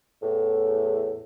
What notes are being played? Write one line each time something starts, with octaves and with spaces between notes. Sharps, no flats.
E2 A2